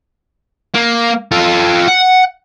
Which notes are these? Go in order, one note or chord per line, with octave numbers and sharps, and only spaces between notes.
A#3
F4 A4
F#5